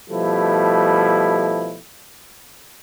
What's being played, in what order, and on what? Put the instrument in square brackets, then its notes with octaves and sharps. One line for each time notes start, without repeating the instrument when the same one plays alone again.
[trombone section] B2 F3 G3 A3 E4